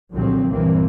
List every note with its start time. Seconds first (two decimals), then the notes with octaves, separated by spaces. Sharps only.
0.13 C2 A#2 D3 F3 F#3 C4
0.52 C2 G2 A#2 E3 A#3 C4